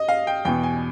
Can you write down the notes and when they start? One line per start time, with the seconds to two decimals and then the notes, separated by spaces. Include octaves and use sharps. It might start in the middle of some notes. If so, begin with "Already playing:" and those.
Already playing: D#5
0.09 F5
0.27 G5
0.45 E2 B2 G5
0.63 G#5